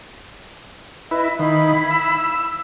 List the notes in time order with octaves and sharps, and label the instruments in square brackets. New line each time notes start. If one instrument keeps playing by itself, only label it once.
[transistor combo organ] E4 B4 [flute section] D#5 E5
[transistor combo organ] D#3 [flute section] E4 F5 B5
[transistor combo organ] E6